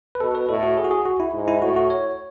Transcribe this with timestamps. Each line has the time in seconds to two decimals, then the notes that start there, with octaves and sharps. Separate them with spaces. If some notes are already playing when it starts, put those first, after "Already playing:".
0.15 B4
0.20 B2 A4
0.35 B4
0.49 A2 A4
0.63 F#4
0.77 G#4
0.84 F#4
0.91 G#4
1.05 F#4
1.20 E4
1.34 G#2
1.48 E4
1.62 A2 F#4
1.76 F#4
1.90 C#5